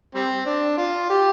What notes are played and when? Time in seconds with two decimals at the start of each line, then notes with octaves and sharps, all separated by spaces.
0.15 G3 C4
0.46 D4
0.77 F4
1.09 G4